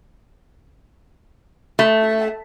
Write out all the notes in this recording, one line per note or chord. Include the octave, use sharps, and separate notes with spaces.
A3